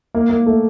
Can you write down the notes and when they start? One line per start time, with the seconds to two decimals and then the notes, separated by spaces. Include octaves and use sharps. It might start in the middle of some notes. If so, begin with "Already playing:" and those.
0.15 A#3
0.30 A#3
0.46 A3